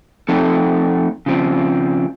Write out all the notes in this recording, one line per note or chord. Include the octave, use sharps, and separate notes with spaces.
F3 A3 C4 D#4 A4
C#3 F3 C4